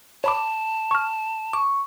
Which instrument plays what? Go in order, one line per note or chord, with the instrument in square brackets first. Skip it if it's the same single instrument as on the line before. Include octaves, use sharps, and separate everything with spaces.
[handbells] C#5 B5 D6 [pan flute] A5
[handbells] C#6 F6
[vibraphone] C#6 [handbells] D6